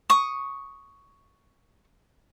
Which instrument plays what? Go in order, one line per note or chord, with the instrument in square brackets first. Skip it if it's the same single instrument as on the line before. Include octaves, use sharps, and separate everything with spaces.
[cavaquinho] C#6 D#6